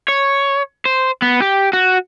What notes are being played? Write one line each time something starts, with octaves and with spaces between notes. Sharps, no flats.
C#5
C5
B3
G4
F#4